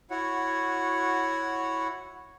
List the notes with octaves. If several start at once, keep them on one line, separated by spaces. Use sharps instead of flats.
E4 F#4 C#5 F#5